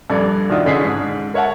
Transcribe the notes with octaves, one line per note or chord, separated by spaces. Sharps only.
A#1 G2 A4 D5 G#6
D#3 D4 F4 F#4 E5 D#6
A1 D3 C#4 G#4 B6 C7
G#2
A#4 C#5 E5 F#5 A5